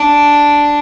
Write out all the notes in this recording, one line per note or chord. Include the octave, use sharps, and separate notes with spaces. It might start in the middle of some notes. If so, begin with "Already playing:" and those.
Already playing: D4